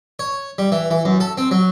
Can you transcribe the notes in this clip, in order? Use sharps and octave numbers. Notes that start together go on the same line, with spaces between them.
C#5
G3
E3
E3
F#2
A4
C4
F#3